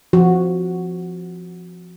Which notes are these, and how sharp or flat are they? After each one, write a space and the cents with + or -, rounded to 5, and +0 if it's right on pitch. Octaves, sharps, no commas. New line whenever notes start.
F3 +0 F#4 +0